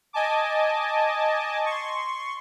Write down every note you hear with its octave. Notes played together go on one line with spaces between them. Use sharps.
D#5 G#5 A5 D6
C6 C#6